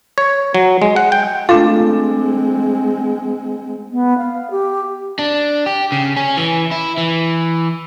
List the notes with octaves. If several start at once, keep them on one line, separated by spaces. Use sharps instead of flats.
C#5
F#3
G#3
F#5
G5
G#3 A3 C4 D4 F4 A4
B3
F5
G4
D4
G4
C#3
C#4
E3
E4
E3